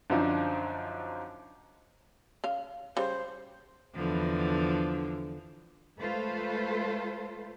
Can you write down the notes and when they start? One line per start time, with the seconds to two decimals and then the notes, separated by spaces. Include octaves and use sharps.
0.10 F#2 D3 F3 D4 D#4 F4
2.44 C#3 F5
2.97 C#3 G3 C5
3.95 E2 D3 F3
5.98 G#3 A3 F4 A4 B4 C5